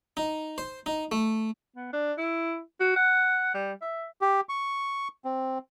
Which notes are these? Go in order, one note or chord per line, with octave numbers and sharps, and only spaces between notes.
D#4
C5
D#4
A3
B3
D4
E4
F#4
F#5
G3
E5
G4
C#6
C4